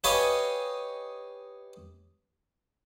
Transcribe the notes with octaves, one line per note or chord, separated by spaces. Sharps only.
G4 B4 C#5 D#5 F5 G#5